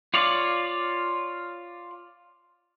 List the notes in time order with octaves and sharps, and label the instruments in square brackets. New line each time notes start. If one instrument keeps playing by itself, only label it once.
[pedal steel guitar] F4 C#5 D5 F5